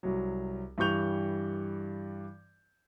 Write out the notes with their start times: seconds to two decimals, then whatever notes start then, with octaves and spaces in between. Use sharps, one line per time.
0.03 C2 F#3
0.78 G2 E3 G3 C#6 G6 F7